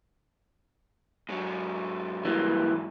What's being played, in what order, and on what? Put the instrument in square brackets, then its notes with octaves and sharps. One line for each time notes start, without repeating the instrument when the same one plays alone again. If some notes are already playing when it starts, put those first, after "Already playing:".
[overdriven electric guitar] G#2 F#3
[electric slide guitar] E3 G3 A#3